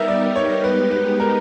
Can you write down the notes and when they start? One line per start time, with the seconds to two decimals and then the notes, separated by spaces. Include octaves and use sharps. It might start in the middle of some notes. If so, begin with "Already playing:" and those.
Already playing: G3 B3 D#4 G4 A#4 E5
0.08 D5
0.36 C#5
0.64 G#3 B3 D#4 G4 B4
0.91 B4
1.20 A#4